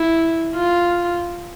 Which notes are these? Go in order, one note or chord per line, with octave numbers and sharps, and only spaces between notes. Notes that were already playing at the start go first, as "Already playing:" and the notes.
Already playing: E4
F4